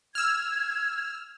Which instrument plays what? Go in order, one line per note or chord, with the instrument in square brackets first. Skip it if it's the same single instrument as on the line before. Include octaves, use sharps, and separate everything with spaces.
[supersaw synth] E6 F6 [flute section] G#6